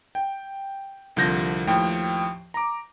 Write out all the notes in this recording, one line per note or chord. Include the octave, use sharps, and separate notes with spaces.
G5
C2 D3 F3 G6 A#6
D#2 A2 F3 G5
A#5 D6